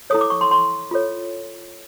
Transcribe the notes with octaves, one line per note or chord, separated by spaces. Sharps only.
E4 A4 C#5 D#6
D6
C#6
C6
C6
F4 A4 C#5